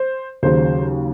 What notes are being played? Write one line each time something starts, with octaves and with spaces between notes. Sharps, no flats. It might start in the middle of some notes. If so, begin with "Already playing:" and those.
Already playing: C5
D#2 C#3 F#3 C5